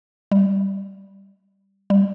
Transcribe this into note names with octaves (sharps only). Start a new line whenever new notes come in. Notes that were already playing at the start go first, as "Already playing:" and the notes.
G3
G3